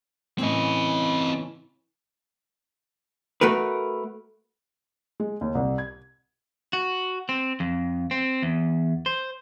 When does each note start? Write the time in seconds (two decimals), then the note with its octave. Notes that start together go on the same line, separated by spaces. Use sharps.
0.39 A2 C#3 E3 C4 D#5
3.41 A3 F#4 A#4 B4
5.20 G#3
5.41 D#2
5.55 C2
5.78 G#6
6.73 F#4
7.29 C4
7.60 F2
8.11 C4
8.42 E2
9.06 C5